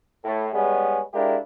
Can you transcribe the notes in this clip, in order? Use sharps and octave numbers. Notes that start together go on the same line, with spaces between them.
A2
G3 G#3 B3 C#4 G#4
G#3 D4 E4 F4 G4 A#4